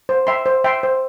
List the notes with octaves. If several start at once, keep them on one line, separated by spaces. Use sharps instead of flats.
C5
E5 G5 C6
C5
E5 G5 C6
C5